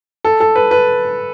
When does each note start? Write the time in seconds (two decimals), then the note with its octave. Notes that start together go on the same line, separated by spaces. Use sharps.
0.25 A4
0.40 A4
0.56 B4
0.71 B4